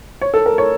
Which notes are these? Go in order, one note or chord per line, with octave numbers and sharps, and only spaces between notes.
C#5
A4
A#4
C#5